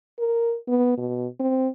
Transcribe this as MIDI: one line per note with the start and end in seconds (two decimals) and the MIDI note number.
0.19 0.56 70
0.68 0.93 59
0.98 1.27 47
1.40 1.68 60